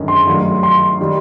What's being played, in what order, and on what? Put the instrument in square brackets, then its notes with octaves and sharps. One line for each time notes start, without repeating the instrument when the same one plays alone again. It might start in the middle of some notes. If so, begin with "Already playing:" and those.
Already playing: [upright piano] G1 F#2 D#3 G#3 C#4
[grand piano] C6
[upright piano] G2 D#3 F#3 A3
[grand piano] C6
[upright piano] D#3 G3